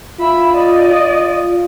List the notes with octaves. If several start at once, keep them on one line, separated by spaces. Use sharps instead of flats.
F4 E5 B5
D5 D#5
F4